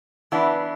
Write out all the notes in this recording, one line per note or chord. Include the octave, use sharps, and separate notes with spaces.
E3 B3 D4